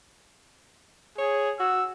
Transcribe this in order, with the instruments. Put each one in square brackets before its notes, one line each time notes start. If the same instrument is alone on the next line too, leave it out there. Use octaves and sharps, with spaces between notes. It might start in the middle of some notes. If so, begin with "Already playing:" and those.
[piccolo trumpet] G#4 [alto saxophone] C#5
[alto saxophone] F#4 [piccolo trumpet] E6